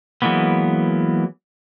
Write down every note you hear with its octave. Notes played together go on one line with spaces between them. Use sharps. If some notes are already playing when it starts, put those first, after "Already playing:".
E3 F#3 G#3 A#3 B3